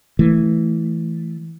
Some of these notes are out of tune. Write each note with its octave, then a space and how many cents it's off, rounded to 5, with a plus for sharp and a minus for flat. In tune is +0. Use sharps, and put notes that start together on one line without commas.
E3 +0 A3 +0